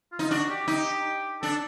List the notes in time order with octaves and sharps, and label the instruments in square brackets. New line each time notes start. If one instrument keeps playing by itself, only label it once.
[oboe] F4
[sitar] D#4
[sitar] D4 [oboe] F#4
[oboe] G4
[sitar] D#4 [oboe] G4
[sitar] D4 [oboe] A4